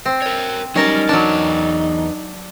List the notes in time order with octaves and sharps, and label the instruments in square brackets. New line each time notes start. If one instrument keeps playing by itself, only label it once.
[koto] C4
[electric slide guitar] A#4 C#5
[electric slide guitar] F#3 G3 G4 [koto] C#4 A#4 A5 [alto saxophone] D#4
[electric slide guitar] E2 G#2 A5 [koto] F#3 D4